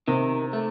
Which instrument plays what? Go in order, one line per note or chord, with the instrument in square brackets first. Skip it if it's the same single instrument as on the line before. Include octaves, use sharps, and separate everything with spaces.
[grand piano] C3 [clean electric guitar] D#3
[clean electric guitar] A3